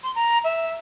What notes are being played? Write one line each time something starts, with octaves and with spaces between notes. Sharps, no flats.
C6
A#5
E5